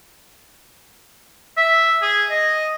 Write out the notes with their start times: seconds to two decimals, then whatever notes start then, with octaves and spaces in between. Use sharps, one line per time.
1.57 E5
2.02 G#4
2.31 D#5